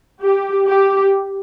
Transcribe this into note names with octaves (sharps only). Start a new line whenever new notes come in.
G4
G4